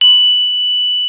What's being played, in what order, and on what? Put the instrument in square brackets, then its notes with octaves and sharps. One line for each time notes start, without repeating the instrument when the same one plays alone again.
[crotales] F#7